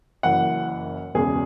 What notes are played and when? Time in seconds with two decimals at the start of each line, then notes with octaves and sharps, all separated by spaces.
0.23 F#1 F#2 E3 F#5
1.14 E1 E2 C#3 G#4